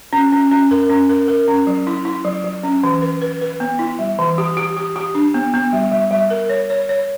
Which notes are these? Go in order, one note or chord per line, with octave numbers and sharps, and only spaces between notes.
C#4
C#4
C#4
A#4
C#4
A#4
A#4
C#4
F#3
E4
E4
F#3
F#3
C#4
E3
B4
B4
B4
B3
E4
G3
E3
G4
G4
G4
G4
D4
B3
B3
G3
G3
G3
A#4
C#5
C#5
C#5